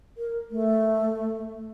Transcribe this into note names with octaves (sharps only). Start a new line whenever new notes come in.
A#4
A3